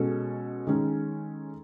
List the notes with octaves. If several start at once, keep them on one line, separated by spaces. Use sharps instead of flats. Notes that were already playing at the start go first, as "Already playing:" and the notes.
Already playing: B2 G#3 C#4 A4
D#3 G#3 C#4